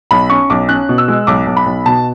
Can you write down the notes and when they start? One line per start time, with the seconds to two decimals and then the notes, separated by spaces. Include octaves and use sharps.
0.11 B1 B5
0.30 C#4 C#6
0.50 B1 D6
0.69 C#4 F#6
0.89 B2
0.98 E6
1.08 G#3
1.27 B1 D6
1.46 B1
1.57 B5
1.66 B1
1.86 B2 A5